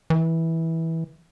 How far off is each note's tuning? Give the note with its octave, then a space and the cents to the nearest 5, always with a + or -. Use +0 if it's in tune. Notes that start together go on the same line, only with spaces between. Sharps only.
E3 -15